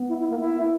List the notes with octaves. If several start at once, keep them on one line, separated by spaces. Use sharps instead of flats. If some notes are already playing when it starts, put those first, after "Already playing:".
Already playing: B3
E4
E4
A#3
E4